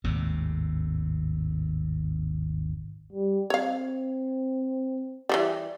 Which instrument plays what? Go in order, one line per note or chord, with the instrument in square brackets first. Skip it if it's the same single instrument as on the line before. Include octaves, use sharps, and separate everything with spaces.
[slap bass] G#1 D#2 A2 C3
[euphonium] G3
[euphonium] C4 [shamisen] C#5 F5
[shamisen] E3 F#3 G3